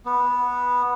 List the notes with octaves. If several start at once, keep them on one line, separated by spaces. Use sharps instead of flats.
B3